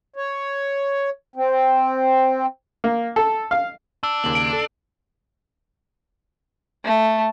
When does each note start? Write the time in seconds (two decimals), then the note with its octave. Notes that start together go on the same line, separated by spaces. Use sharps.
0.16 C#5
1.36 C4
2.84 A#3
3.16 A4
3.51 F5
4.03 D4 E6
4.24 D#2 C#3 A#3 F#7
4.35 D7
4.53 A4
6.84 A3